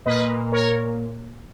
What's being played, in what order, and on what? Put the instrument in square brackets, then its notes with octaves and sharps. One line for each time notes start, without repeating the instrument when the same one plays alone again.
[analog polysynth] A#2 A#3 B4 D#5
A#4 C#5